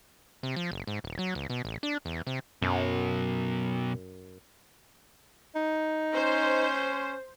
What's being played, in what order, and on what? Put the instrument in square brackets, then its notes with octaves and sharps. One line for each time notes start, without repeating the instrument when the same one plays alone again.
[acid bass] C3
F3
F#1
G#2
D#1
F#3
C#2
B2
A1
D4
E2
C3
[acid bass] F#2 [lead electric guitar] B2 F#3
[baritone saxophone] D#4
[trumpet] C#4 [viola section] C5